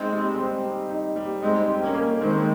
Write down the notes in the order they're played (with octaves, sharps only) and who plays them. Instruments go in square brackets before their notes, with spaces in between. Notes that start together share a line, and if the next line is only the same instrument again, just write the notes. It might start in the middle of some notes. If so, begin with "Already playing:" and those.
Already playing: [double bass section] G#3 C4 [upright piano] D#4
[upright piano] G3
C4
G3
D#4
G3
[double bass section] G#3 C4 [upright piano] D#4
[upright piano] G4
[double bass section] A#3 C#4
[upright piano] A#3
[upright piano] D#3 [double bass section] G#3 C4